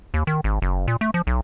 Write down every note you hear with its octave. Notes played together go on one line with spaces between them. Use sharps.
D#2
D#3
G#1
F#1
A#2
A3
F3
B1